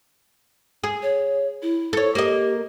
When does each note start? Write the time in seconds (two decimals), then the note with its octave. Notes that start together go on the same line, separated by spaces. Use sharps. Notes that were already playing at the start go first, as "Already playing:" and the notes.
0.84 G#4
1.03 C#5
1.62 E4
1.93 A4 C#5
2.15 A#3 G4 D#5